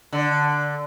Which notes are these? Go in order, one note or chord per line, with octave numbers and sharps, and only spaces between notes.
D3